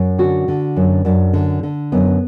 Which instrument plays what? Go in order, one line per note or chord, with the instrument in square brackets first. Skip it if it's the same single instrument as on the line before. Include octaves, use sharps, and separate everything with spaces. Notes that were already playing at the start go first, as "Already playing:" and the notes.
Already playing: [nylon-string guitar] F#2
D3 F#4
D3
F#2
F#2 D4
D3
D3
F#2 B3